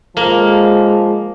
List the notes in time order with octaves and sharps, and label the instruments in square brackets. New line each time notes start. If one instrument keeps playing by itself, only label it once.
[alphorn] F3 [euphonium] G#3 [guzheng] A#3